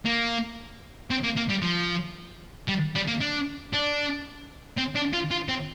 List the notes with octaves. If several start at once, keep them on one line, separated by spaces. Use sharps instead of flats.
A#3
C4
A#3
A#3
G3
F3
G3
G3
A#3
D4
D4
C4
D4
F4
F4
C4